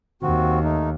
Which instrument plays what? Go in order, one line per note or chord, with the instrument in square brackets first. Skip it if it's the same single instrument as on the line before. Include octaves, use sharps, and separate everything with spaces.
[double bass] D#2 [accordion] C4 F#4
[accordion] A3 D#4